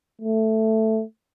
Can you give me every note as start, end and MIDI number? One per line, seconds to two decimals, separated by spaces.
0.22 1.03 57